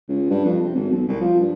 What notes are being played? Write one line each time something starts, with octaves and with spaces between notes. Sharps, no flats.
C#2
G2
F2
C3
G#1
B1
C2
F3
G2